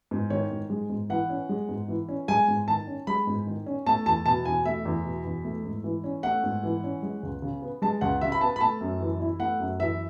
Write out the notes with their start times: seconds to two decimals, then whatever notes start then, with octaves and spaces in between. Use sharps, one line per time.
0.11 G#2
0.30 D#3 C#5
0.50 G#2
0.70 G#3
0.89 G#2
1.09 E3 F#5
1.30 C#4
1.49 G#3
1.69 G#2
1.88 E3
2.09 C#4
2.28 G#3 G#5
2.48 G#2
2.68 D#3 A5
2.87 C#4
3.07 G#3 B5
3.27 G#2
3.47 D#3
3.66 C#4
3.86 A3 A5
4.06 E2 A5
4.26 B2 A5
4.45 E2 G#5
4.65 A3 E5
4.85 E2
5.05 B2
5.25 E2
5.44 A3
5.64 G#2
5.84 E3
6.04 C#4
6.23 A3 F#5
6.43 G#2
6.63 E3
6.84 C#4
7.03 G#3
7.23 C#2
7.42 C#3
7.62 B3
7.82 G#3 A5
8.01 C#2 F#5
8.21 C#3 E5
8.32 B5
8.41 B3 A5
8.56 B5
8.61 A3 A5
8.81 F#2
9.01 E3
9.20 E4
9.40 A3 F#5
9.60 F#2
9.80 E3 E5